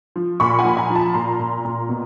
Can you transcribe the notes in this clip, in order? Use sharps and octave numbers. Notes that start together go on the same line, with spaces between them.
F3
A#2 B5 C#6
F#5 G#5
F3 B5
G#5 A#5
F3
A5 B5
A#2 A#5 C6
A#2
A#2
B2